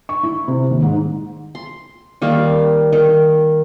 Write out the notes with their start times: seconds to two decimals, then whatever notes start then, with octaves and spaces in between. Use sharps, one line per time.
0.09 C#6
0.23 E4
0.48 C3
0.70 D#2
0.83 G#2
1.55 C6
2.22 D#3 G3 A#3
2.93 D#3